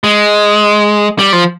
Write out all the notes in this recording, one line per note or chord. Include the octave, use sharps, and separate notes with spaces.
G#3
G3
F3